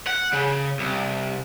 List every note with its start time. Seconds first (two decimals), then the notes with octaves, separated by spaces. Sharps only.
0.07 F#5
0.33 C#3
0.79 C2